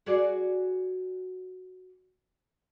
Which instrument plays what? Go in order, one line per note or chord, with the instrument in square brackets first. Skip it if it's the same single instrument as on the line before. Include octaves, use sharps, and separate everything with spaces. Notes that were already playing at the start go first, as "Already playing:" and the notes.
[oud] F#4 G#4 D5